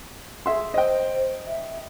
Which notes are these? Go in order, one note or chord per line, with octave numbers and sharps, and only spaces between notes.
G#4 E5 C6
C5 D#5 G5
E5